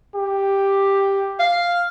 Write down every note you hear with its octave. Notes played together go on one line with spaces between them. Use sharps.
G4
F5